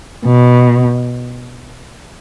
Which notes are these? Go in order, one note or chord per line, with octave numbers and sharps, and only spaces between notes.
B2